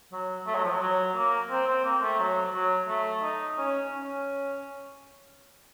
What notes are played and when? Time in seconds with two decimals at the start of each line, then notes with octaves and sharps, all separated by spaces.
0.12 F#3
0.47 A3
0.55 F#3
0.64 F3
0.71 F#3
0.82 F#3
1.16 A#3
1.50 C4
1.67 C4
1.85 A#3
2.02 A3
2.19 F#3
2.54 F#3
2.88 A3
3.22 D#4
3.58 C#4
3.92 C#4